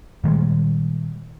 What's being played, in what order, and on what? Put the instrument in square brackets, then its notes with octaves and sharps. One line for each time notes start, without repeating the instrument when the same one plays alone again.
[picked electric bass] A#2 D#3 G3 G#3